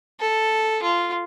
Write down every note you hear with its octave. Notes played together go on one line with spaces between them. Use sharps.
A4
F4